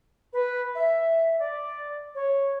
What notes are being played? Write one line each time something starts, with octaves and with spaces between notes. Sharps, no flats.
B4
E5
D5
C#5